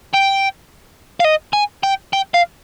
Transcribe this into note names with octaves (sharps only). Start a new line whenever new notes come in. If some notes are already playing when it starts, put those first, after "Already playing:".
G5
F5
D#5
G#5
G5
G5
F5